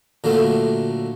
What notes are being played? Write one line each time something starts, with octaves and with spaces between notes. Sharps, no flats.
A#2 D3 F#3 A3